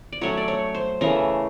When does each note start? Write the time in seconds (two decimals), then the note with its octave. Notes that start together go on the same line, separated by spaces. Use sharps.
0.12 D5
0.21 F#3 A3 C#4 C#5
0.37 D5
0.48 C#5
0.75 C5
1.01 C#3 E3 A3 A#4